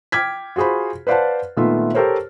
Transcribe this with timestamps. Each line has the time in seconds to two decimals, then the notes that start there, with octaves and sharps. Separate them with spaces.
0.12 G5 D6 F6 G#6 B6
0.56 F4 F#4 G#4 C5 B5
1.07 B4 C5 D5 F5 F#5 A5
1.57 A#2 D#3 A3 B3 F4 E5
1.95 G4 A4 A#4 C5 C#5